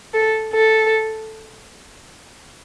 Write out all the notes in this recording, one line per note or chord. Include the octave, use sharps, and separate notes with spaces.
A4
A4